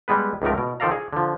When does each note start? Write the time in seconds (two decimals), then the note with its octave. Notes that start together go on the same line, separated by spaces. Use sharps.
0.08 G3 G#3 B3 B4
0.42 C#2 G#2 F3 A3 A#4
0.58 B2
0.80 D#3 F3 A4 D5 F5 A#5
0.92 G#4
1.13 D3 F3